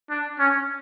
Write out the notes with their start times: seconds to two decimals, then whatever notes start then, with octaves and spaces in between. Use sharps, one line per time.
0.10 D4
0.39 C#4